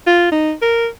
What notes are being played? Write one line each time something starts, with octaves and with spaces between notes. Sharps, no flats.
F4
D#4
A#4